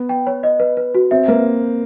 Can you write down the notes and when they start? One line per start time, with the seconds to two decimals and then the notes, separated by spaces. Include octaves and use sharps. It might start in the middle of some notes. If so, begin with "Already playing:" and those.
Already playing: B3
0.09 G5
0.27 C#5
0.43 D#5
0.60 B4
0.77 B4
0.95 F#4
1.11 C4 E5
1.28 A#3 B4